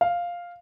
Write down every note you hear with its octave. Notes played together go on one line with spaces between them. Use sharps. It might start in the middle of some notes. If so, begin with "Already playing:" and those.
F5